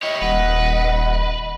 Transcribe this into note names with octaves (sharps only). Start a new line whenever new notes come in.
E4 G4 C#5 D#5
D#1 B4 F#5